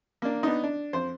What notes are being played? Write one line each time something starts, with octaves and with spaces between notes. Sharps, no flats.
A#3 D4
B3 D4 D#4
D4
F2 C5